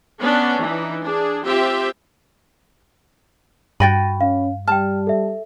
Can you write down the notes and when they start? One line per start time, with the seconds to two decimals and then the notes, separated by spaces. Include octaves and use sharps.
0.20 B3 C#4 D4
0.61 E3 D#4
1.03 D4 G#4
1.43 C4 F4 G4 E5 G5
3.80 G2 F#4 G5 B5 A6 A#6 D#7
4.21 C#4 F5
4.68 G3 G5 A5 F6
5.07 A4 E5